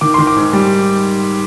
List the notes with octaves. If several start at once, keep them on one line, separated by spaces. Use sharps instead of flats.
D#3 D6
D#3 C6
D6
G#2
G3